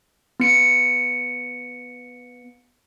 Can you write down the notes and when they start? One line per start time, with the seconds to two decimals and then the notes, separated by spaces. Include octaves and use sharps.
0.40 B3 C#7 D7